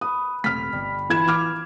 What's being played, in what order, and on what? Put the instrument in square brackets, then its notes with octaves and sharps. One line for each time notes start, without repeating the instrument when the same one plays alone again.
[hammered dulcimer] B4 [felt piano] D#6
[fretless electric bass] D#1 C3 A3 [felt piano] F6 B6
[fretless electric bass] G1 [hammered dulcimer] G3
[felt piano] E3 G#6 E7 [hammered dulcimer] F4 B4 B5
[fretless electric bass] E3 [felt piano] D6 F6